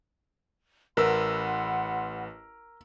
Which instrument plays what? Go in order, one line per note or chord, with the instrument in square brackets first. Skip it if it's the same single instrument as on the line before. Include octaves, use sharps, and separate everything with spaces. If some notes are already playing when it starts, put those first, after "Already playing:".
[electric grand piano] A1 B4 E6 [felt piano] A#4 [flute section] F#5 B5 C6